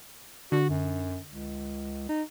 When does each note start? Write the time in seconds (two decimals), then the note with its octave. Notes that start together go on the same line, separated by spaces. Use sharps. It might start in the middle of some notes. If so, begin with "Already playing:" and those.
0.52 D3 F#4
0.69 F#2
1.31 C#2
2.09 D#4